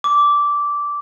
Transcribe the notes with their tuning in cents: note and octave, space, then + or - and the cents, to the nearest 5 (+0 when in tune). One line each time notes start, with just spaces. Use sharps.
D6 -10